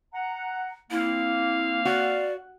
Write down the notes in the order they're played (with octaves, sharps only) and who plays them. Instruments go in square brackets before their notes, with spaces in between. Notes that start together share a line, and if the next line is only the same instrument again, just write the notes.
[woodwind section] F#5 A#5
[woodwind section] A#3 C4 [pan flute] E4 [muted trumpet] F5
[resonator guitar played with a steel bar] F#4 [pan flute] D5